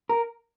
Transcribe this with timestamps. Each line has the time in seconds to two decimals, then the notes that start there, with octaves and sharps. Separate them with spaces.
0.09 A#4